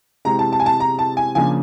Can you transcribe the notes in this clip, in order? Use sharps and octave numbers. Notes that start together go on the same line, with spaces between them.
C3 E3 G#3 C4 A#5
A5
A5
G#5
A5
A#5
A5
G#5
C#3 F3 A#3 D4 G#5